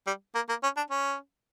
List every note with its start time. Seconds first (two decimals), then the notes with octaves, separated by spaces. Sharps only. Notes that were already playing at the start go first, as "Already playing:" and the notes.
0.07 G3
0.35 A#3
0.49 A#3
0.63 C#4
0.77 D4
0.91 C#4